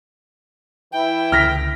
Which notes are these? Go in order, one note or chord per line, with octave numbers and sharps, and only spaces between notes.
E3 E4 G5
C#2 D3 F6 A#6 B6